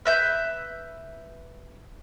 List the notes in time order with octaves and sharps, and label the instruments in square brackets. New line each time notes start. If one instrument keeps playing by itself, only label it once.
[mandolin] B4 E5 G6